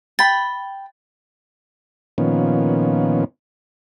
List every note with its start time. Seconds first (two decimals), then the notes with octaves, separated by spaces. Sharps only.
0.19 G5 B5 A6
2.18 A#2 D#3 F3 B3 C#4